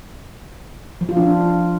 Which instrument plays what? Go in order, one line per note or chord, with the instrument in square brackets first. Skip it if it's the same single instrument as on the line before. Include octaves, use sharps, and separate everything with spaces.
[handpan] F3
F4
D4